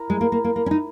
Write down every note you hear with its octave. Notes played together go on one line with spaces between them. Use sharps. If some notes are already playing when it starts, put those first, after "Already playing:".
Already playing: E4 A#4
G#3
A#3
A#3
A#3
A#3
C#4
D#4